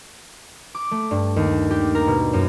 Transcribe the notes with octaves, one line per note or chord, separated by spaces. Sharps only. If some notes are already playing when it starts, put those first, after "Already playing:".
D6
A3
G2
D#2
G4
A#4
B2
F#2